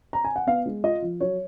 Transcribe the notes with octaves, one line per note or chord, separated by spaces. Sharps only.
A#5
G#5
F#5
B3 F5
G#3
F4 D#5
F3
F#3 C#5